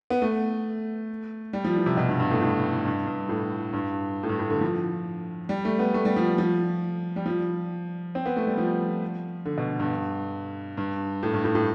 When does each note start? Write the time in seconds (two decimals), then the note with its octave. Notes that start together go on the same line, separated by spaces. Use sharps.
0.10 B3
0.22 A3
1.53 G3
1.64 F3
1.76 E3
1.86 C3
1.97 B2
2.09 G2
2.20 G2
2.31 A2
2.41 A2
2.85 G2
3.07 G2
3.29 A2
3.73 G2
4.23 A2
4.29 G2
4.39 A2
4.50 D3
4.61 F3
5.49 G3
5.65 A3
5.79 B3
5.94 A3
6.05 G3
6.16 F3
6.38 F3
7.16 G3
7.26 F3
8.15 C4
8.26 B3
8.36 A3
8.47 G3
8.58 F3
9.45 D3
9.58 B2
9.80 G2
10.77 G2
11.23 A2
11.33 G2
11.45 A2
11.55 A2